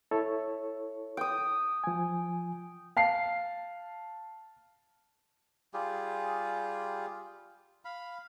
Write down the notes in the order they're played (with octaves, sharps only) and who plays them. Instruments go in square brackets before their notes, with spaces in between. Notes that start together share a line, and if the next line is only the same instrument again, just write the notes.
[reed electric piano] E4 A4 C#5
[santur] G5 D#6
[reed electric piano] F3 G#5
[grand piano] F5 A5 C7
[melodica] G3 F4 G4 G#4
F5 B5